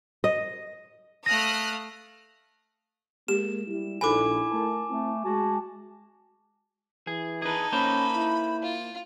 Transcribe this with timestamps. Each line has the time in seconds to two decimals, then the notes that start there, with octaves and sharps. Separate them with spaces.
0.24 D#5
1.26 A3 F5 D#6 F6 F#6 A#6
3.28 G#3 A#3 G4 E7
3.67 G3 E4
4.01 A#1 D#4 E4 A4 G#5 B5 D6
4.52 A3 A#4 A5
4.89 A3 C4 E4 A5
5.25 G#3 F#4 G#5 A5
7.07 E3 G#4
7.42 D#4 G#4 A4 B4
7.72 A#3 C#4 C5 B5
8.15 E4
8.63 F4